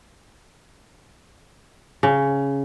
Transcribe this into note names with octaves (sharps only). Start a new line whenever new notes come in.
C#3